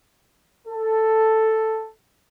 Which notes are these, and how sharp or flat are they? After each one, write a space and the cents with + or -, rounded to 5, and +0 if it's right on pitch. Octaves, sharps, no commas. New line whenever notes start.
A4 +5